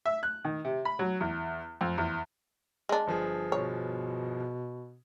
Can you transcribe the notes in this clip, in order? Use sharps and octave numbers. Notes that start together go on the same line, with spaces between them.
E5
F#6
D#3
C3
B5
F#3
E2
F2
E2
G#3 D4
G1 F3 G#4
B2 C#5